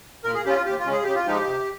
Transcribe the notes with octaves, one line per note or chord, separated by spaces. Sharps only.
A#2 A#4
G#4
G3 C#4 F4 G4
F4
D#2 G4
F4
C#3 G#3 C#4
G#4
C#3 G4
F4
F3 G#3 D#4 G4
C3